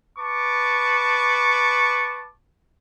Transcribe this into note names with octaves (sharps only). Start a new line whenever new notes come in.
B4 A5 C#6 D6